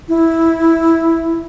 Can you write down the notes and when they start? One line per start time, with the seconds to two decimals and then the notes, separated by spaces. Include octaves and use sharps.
0.09 E4